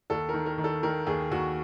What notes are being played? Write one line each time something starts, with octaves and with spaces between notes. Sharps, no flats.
D#2 A4
D#3 A#4
A#4
D#3
A4
D#3 A#4
D#2 G#4
D#2 F#4